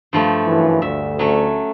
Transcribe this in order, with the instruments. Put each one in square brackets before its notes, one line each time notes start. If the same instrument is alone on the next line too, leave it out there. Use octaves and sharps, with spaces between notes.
[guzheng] G2 F3 A3
[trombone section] F#2 E3
[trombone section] D2 [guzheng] E5
[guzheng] F#3 A3 C#4